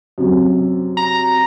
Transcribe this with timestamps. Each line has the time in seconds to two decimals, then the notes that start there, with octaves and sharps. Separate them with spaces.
0.18 F#2 C3
0.97 A#5